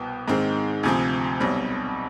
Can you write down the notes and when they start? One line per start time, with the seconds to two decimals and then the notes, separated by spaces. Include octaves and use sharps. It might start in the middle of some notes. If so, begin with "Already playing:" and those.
Already playing: C2 B2 B3 G5
0.28 G#2 D#3 G#3 C4
0.83 D2 C3 F3 C4 G#5
1.40 B1 B2 G3 C4